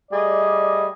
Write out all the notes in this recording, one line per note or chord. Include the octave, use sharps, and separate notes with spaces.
G3 A3 G#4 D5 D#5